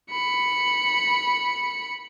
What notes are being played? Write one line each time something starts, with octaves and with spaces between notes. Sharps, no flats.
B5 C#7